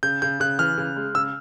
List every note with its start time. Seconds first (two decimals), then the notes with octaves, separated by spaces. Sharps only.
0.03 C#3 G6
0.22 C#3 G6
0.40 C#3 F#6
0.59 E3 F6
0.77 C#3
0.96 G#3
1.14 C#3 E6